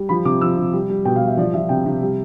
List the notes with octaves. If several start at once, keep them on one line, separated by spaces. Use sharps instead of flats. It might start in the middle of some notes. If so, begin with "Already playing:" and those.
Already playing: G3
F3 B5
C3 D6
F3 E6
C3
G3
G3
B2 G5
F5
G3
E5
F3 D5
F3 E5
C3 G5
C3
G3